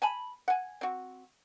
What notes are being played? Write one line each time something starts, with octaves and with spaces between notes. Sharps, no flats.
G#5 A5 B5
F#5 G#5
C4 F#4